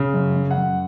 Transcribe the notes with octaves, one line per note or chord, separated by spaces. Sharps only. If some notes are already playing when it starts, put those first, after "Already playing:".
Already playing: C#3
F#2
F#2
F#5
F#2